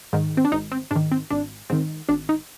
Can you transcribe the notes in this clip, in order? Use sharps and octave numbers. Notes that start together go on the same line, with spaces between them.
G#2 D#3
C4
D4
G#1 D#4
C4
G#2 D#3 D4
C4
G#1 D4
G#2 D#3 C4
G#1 D4
D#4